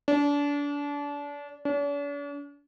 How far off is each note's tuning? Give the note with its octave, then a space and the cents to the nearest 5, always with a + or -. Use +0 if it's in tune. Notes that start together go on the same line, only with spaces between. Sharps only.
D4 -30
D4 -45